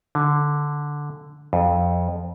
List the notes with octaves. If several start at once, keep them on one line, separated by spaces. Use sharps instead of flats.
D3
F2